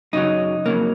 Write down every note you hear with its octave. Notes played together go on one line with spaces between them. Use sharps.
F#2 C#3 F#3 D#4
F2 C#3 F#3 A#3